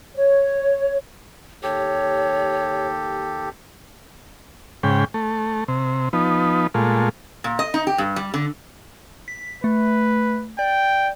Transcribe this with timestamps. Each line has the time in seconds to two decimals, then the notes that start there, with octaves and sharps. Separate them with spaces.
0.16 C#5
1.63 D#2 G4 A4 C#5
4.83 G#2 C#3 G5
5.14 A3
5.68 C3
6.13 F3 B3 D#4
6.74 A#2 G#3 A3 F4
7.44 A#2
7.59 D#5
7.74 D#4
7.87 G4
7.98 G2
8.16 G3
8.34 D3
9.28 B6
9.64 A3 B4
10.59 D5 G5